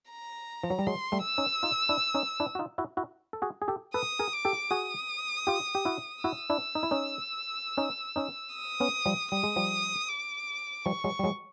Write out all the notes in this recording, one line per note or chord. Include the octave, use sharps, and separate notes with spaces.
A#5
F3
F#3
G3
F#3 G#3 C6
G3 A3
E6
C#4 D#4
D#4 F4
D4 E4
C#4 D#4
D4 E4
F#4
D#4 F4
E4 F#4
E4 F#4
A4
F#4 G#4
G#4
G4 A4
A4 B4 D#6
G#4 A#4
D6
G4 A4
F#4 G#4 D#6
F4 G4
G4
E4 F#4
E4 F#4 E6
D4 E4
D#4
E4
C#4 D#4
C#4 D#4
C#4 D#4
D#6
B3 C#4
F3 G3
G3 D#6
G#3
F3 G3
D6
F3 G3 C#6
F#3 G#3
G3
F#3 G#3